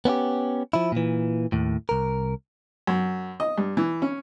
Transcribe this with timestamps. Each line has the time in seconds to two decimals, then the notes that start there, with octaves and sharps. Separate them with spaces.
0.05 B3 C#4 E4 G4
0.73 F3 E4
0.92 A#2 E3
1.52 D#2 A2
1.89 C2 A#4
2.87 F#2
3.40 D#5
3.58 G2
3.77 E3
4.02 C#4